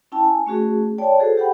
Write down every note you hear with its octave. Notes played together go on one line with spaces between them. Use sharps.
C#4 E4 G5 A5
G#5
A3 C#4 F#4 G#4
C#5 D5 G5 A5
F#4 G#4 A4 C5
G4 F#5 G5 B5